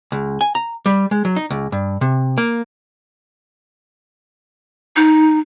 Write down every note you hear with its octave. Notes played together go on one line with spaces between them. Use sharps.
C#2
G#5
A#5
G3
G#3
F#3
D#4
C#2
G2
C3
A#3
D#4